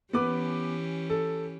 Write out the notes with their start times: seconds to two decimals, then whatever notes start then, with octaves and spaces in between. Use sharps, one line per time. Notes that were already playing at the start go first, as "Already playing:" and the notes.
0.13 E3 B3 C#4 G4 B4 D6
1.10 A4